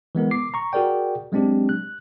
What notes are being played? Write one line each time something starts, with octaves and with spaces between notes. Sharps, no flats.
E3 G#3 B3 A#4
D6 C7
A#5 C#6
F#4 G#4 A#4 D5 G5
F#3 G#3 C4 D4 G4
F#6